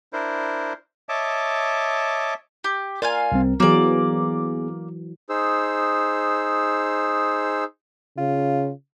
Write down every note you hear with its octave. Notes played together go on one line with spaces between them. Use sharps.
D4 E4 A#4 C5
C#5 D#5 E5 A5 D6
G4
F4 A#4 D5 F5 G#5
C2 G3 C4
E3 F#3 A#3 B3 G#4 D5
D#4 G#4 C5 E6
C#3 F4